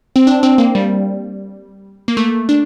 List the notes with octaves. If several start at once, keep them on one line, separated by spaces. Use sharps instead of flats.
C4
D4
C4
A#3
G3
A#3
A3
D4